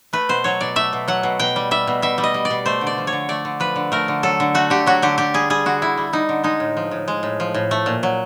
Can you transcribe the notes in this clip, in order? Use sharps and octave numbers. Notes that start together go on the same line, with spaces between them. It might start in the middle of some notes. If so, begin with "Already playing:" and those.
A3 B4
B2 C5
F#3 C#5
B2 D5
A3 E5
B2
F#3 F#5
B2
B2 G5
G3
G3 E5
B2
B2 E5
G3
D#5
G3
D5
B2
A3 C5
D3
D5
F3
C#5
D3
A3 D5
D3
F3 B4
D3
A3 A#4
D3
F#3 A4
D3
A3 F#4
D3 G4
F#3 F#4
D3 G4
D3 G4
G3 G#4
G3 G#4
D3 F#4
D3 E4
G3
G3 D#4
D3
G#3 D#4
A2
F3
A2
G#3
A2
F3
A2
A3
A#2
F#3